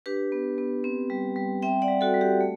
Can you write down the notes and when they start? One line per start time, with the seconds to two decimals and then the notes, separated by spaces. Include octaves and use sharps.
0.06 D4 G4 B4
0.32 B3
0.58 B3
0.84 C4
1.10 G3
1.36 G3
1.62 C4 E5 G5
1.82 D5 F#5
1.88 G3
2.01 F#4 A4
2.14 G3
2.21 G4
2.41 A3